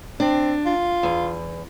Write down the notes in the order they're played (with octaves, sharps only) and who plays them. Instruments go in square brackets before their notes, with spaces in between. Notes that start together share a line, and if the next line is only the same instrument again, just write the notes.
[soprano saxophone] C4 [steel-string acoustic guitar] D4
[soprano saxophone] F4
[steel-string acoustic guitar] E2